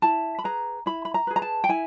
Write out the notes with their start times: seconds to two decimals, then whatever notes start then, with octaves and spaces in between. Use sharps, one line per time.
0.02 E4 A5
0.39 B5
0.44 G#4 B4 A#5
0.86 E4 B5
1.05 B5
1.14 A#5
1.27 G#4 B4
1.36 A#5
1.42 A5
1.64 G5
1.69 E4 G#5